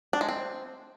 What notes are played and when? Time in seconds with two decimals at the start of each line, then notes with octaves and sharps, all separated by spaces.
0.13 D4
0.21 G#3
0.29 C4